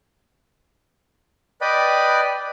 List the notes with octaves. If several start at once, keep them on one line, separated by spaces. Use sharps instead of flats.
B4 D5 D#5 G5 B5